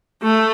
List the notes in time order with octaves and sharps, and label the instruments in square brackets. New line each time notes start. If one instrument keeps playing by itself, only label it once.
[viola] A3